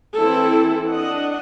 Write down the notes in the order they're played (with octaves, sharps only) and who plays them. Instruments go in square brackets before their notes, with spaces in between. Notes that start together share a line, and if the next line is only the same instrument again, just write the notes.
[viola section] E3 C4 E4 A4
D4 D#5 F#5